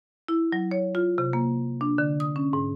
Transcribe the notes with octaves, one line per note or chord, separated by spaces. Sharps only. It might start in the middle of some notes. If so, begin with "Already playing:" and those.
E4
F#3
C#5
F4
C3
A#3
D4
D3
D#6
C#4
G#2